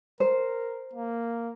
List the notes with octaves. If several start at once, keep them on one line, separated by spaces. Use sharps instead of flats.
A#4 C5
A#3